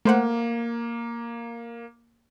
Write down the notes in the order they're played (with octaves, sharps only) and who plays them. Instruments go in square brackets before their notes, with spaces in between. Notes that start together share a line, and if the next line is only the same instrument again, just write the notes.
[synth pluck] A3 C5 F#5 [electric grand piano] A#3